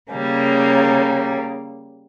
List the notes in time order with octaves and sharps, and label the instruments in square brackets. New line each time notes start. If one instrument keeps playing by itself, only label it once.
[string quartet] C#3 G3 A#3